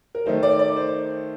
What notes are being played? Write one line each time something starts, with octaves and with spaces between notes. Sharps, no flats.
A#4
D#3 A3 D#4 C5
D5
D5
C5